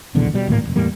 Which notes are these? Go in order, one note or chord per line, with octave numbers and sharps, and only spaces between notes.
D#1 B1 E2 D3
B2 G3
D1 G#1 A2 A#3
F1 A#1
E2 A2 G3 A#3